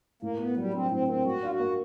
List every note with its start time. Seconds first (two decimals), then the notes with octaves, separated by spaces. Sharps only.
0.22 A2 A#3
0.39 A#3 B3
0.57 F#3 G3
0.73 C4 D4
0.90 A2 C4
1.08 A#3 C4
1.25 G3 F#4
1.42 D4 F4
1.50 F#4
1.60 A#3